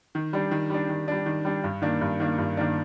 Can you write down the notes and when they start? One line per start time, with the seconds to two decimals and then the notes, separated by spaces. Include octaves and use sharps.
0.15 D#3
0.33 G3 D4
0.51 D#3
0.70 G3 D4
0.89 D#3
1.08 G3 D4
1.26 D#3
1.45 G3 D4
1.64 G2
1.82 D#3 A#3 D4
2.01 G2
2.20 D#3 A#3 D4
2.38 G2
2.57 D#3 A#3 D4